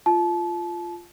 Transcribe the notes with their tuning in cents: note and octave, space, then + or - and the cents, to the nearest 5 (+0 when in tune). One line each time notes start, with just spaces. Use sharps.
F4 -10 A5 -30